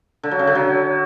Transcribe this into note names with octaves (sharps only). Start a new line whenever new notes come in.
D3
F#3
C#3
D3
F#3